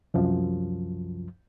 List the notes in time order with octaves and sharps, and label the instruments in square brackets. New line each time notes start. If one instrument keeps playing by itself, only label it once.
[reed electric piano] C2 F#2 F3